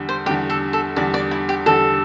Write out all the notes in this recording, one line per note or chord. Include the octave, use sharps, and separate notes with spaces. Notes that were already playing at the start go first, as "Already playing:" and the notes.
Already playing: E2 D3 G3
C5
E2 D3 G3 G4
A4
A4
E2 D3 G3 D5
D5
E4
G4
E2 D3 G3 A4